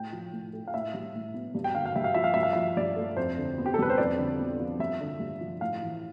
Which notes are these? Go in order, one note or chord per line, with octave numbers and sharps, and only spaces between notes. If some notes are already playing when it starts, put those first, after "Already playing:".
Already playing: A2 G5
F3
A2
A3
F5
A2 E5
G3
A2
B3
G2
G5
D3 F5
F5
G2 E5
F5
F3 E5
F5
G2 E5
F5
F3 E5
G2 D5
A3
F2 C5
D3
B3
G4
A4
G3 B4
C5
F2 D5
D3
B3
F3
G2 E5
D3
G2
F3
A2 F5
E3